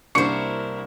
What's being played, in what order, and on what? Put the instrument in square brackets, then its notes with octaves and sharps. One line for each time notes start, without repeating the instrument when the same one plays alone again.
[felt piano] C2 A#3 [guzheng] D4 C5 [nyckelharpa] E4 A#4 [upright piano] C#6 C#7